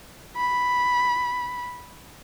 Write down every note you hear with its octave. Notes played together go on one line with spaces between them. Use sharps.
B5